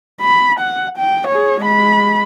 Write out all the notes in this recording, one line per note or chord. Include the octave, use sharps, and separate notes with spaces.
B5
F#5
G5
G#4 C#5
G#3 B5